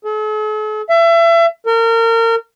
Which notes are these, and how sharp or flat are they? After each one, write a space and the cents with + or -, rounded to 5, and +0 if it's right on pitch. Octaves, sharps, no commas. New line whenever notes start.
A4 -45
E5 +30
A#4 -30